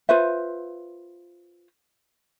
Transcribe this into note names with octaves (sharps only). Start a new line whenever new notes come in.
F4 B4 C5 E5